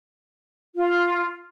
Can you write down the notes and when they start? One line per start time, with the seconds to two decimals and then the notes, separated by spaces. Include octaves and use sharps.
0.76 F4